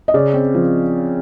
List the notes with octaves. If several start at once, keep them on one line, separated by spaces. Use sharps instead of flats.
D#5
C#3 D5
C4
F3